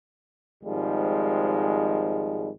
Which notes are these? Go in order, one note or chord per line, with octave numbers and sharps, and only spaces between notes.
G#1 G#2 F3 G3 G#3